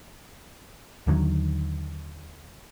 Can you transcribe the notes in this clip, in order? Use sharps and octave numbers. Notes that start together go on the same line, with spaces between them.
D#2 D3 D#3 F#3